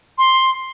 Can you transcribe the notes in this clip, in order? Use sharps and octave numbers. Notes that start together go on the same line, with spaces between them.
C6